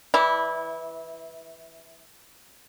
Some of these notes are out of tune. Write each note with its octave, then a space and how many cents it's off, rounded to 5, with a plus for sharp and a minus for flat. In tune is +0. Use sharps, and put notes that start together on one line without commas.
E3 +0 E4 -20 D5 +0